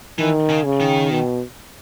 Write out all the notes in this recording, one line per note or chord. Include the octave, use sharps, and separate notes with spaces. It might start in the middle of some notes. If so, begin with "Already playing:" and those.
D#3 E3
C#3
C#3
D#3
B2